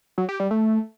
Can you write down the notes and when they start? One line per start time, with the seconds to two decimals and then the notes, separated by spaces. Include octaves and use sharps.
0.18 F#3
0.29 G4
0.40 G3
0.51 A3